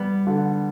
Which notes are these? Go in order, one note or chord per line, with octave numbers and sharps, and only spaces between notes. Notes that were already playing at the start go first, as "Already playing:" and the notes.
Already playing: G3 B3
D3